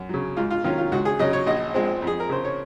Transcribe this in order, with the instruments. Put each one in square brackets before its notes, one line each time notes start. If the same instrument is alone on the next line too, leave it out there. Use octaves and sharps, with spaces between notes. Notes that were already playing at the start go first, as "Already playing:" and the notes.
Already playing: [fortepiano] F#2
C#3 F#3
G#2 F4
F4
D#3 F#3 C#4 F4
F4
C#2 F#4
G#4
C#3 F#3 C#4 D#5
C#5
A#1 D#5
A#2 G#3 C4
F2
G#4
A#4
C#3 F3 C5
C#5